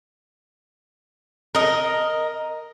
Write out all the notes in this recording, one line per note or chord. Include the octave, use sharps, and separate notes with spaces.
A#4 D#5